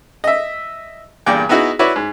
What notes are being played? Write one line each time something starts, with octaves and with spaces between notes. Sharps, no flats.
D#5 E5
E2 G2 A#2 D5 G5
B3 D#4 E4 F#4 G#4
E4 F#4 B4 C#5 D5
G#2